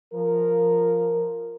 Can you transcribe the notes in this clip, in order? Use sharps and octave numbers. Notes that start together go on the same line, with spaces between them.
F3 A#4